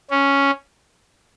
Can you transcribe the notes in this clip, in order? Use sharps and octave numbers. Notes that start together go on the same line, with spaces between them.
C#4